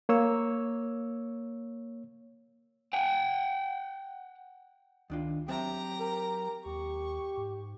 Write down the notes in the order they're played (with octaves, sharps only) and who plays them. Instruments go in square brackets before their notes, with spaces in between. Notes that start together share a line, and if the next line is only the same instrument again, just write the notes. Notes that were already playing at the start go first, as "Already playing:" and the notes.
[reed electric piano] A#3 C#5 E6
[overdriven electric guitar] F#5 G5
[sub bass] C#2 [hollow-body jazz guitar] D#3 D4 F4
[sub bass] F#3 [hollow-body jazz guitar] C4 C5 E5 [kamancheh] G4 A#5
[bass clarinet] A#4
[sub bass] D#2 [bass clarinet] G4 [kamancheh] C#6
[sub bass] G#2